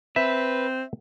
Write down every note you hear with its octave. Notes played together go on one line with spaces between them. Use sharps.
C4 B4 E5